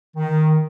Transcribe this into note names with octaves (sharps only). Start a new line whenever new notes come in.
D#3